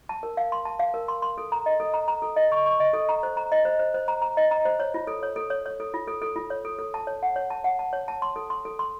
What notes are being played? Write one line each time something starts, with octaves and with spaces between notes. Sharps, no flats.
A5
A#4
F5
C6
A5
F5
A#4
C6
C6
A4
A#5
D#5
A4
A#5
A#5
A4
D#5
C#6
C#6
D#5
A4
A#5
C5
A#5
D#5
C5
C5
C5
A#5
A#5
D#5
A#5
C5
C#5
F4
A4
C#5
A4
C#5
C#5
A4
F4
A4
A4
F4
C#5
A4
A4
A5
C#5
F#5
C#5
A5
F#5
A5
C#5
A5
C6
A4
C6
A4
C6